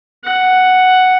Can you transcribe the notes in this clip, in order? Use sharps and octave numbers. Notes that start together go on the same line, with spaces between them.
F#5